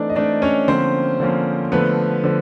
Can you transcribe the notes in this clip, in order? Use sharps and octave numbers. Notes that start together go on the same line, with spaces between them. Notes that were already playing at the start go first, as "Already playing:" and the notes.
Already playing: E3 A3 C4 D4 D#4 D5
D#5
E3 A3 C4 D4 D#4 D5
C#4 C#5
D3 F3 A#3 C4 C#4 C5
D3 F3 A#3 C#4
D3 F3 A3 B3 B4
D3 F3